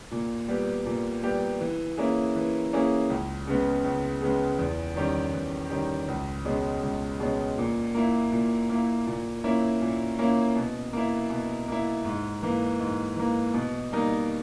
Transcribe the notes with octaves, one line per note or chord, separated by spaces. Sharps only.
A#2
G3 B3 G4
A#2
G3 B3 G4
E3
A#3 C#4 E4 G#4
E3
A#3 C#4 E4 G#4
C#2
C#3 G#3 B3
C#2
C#3 G#3 B3
E2
D#3 G3 C#4 G4
E2
D#3 G3 C#4 G4
C#2
B2 G#3 C#4
C#2
B2 G#3 C#4
A#2
A#3 E4
A#2
A#3 E4
A#2
A#3 C#4 E4
A#2
A#3 C#4 E4
B2
A#3 E4
B2
A#3 E4
G#2
E3 A#3
G#2
E3 A#3
B2
G3 A#3 D#4 A#4